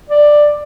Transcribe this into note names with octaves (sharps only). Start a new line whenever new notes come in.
D5